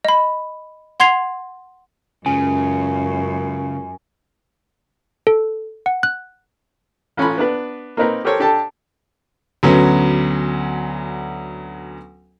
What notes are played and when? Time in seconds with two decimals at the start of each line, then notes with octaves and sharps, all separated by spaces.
0.05 D#5 B5
1.00 F#5 C6 G#6 C7 F7
2.26 C#2 F#2 C#3 G#5
5.27 A4
5.86 F#5
6.03 F#6
7.17 A1 C#4 F4 B5
7.38 B3 D4 B4
7.97 A#3 C4 D#4 A#4 B4
8.25 G4 A4 A#4 C5 C#5
8.40 D4 G4 A4 A5
9.63 D2 F#3 B3 C#4